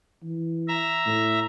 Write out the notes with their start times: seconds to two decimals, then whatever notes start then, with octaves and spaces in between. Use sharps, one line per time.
0.23 E3
0.68 E5 A#5
1.06 A2